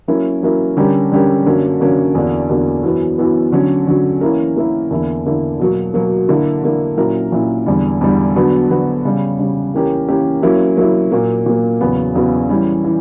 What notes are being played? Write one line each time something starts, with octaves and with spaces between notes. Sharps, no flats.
F#3 A#3 C#4 E4 A#4
F#3 A#3 C#4 E4 A#4
D3 G3 C#4 G4 A#4
D3 G3 C#4 G4 A#4
F#2 D3 A#3 C#4
F#2 D3 A#3 C#4
E2 D3 A#3 D4 F#4
E2 D3 A#3 D4 F#4
F#2 E3 B3
F#2 E3 B3
D3 F#3 C#4
D3 F#3 C#4
E3 A#3 C#4 E4 A#4
E3 A#3 C#4 E4 A#4
E2 D3 A#3 E4
E2 D3 A#3 E4
B2 F#3 A#3
B2 F#3 A#3
D3 A#3 E4
D3 A#3 E4
A#2 F#3 C#4 E4 A#4
A#2 F#3 C#4 E4 A#4
E2 D3 G3
E2 D3 G3
D3 F#3 B3 F#4
D3 F#3 B3 F#4
C#3 G3 C#4
C#3 G3 C#4
E3 A#3 C#4 G4 A#4
E3 A#3 C#4 G4 A#4
F#3 A#3 C#4 E4
F#3 A#3 C#4 E4
A#2 F#3 A#3
A#2 F#3 A#3
E2 C#3 F#3 B3 F#4
E2 C#3 F#3 B3 F#4
E3 G3 C#4
E3